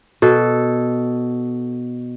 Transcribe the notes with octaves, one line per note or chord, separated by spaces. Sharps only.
B2 A4